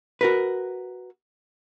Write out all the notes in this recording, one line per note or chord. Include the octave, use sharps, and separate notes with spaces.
F#4 A#4 B4